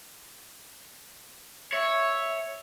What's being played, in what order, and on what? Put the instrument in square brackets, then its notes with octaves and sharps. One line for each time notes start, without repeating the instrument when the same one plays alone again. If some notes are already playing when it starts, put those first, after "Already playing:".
[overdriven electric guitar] C#5 [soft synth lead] E5